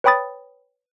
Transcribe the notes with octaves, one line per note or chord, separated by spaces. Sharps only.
B4 C#5 G5 B5 D#6 A6